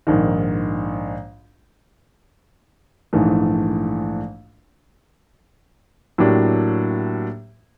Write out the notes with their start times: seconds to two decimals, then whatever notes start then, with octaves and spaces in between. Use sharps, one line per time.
0.07 A#1 G#2 D#3
3.13 A#1 G#2 E3 A3
6.18 A2 F#3 A#3 D4 G4